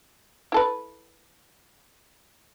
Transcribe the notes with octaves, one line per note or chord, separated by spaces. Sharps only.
E4 A4 B4